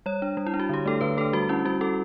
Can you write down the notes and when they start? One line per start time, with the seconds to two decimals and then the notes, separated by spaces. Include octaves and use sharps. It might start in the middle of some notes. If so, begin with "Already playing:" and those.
0.06 G3 C#5
0.22 D4
0.37 G3
0.47 E4
0.54 D4
0.60 F#4
0.69 D3 G4
0.86 A3 D4 A4
1.01 D3 B4
1.17 A3 D4 A4
1.33 G3 F#4
1.49 C#4 E4
1.65 G3 F#4
1.81 C#4 A4